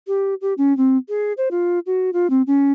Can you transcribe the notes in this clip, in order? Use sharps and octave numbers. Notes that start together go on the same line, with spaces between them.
G4
G4
C#4
C4
G#4
C5
F4
F#4
F4
C4
C#4